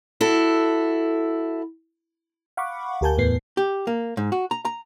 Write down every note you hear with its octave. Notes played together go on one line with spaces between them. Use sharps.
E4 F#4 A4
F5 F#5 B5 C#6 D6
D2 G4 A#4 G#5 A5 G6
E2 A2 B3 C7
G4
A#3
G#2
F#4
A#5
A#5